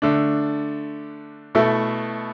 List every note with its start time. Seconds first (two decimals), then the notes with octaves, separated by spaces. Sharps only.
0.02 D3 A3 D4
1.55 B2 A3 E4 A4